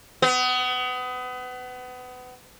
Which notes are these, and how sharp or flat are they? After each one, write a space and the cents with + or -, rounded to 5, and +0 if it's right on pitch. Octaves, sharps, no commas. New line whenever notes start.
B3 +30